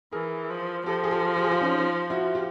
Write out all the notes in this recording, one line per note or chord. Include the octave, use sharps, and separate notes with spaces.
E3 G#4 A#4
F3
F3 G4 A4
G#4
G4 A4
G4
G#4
F4 G4
C#4 D#4
E4 F#4
F4 G4